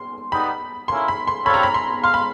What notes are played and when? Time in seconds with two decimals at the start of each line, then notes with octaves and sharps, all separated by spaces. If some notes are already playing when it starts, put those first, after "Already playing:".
Already playing: C6
0.32 G3 B3 D#4 B5
0.88 A#3 C#4 E4 C6
1.08 B5
1.27 C6
1.46 G3 C4 F4 A4 C#5 B5
1.54 A#5
1.63 B5
1.74 C6
2.03 F5 C6
2.14 B5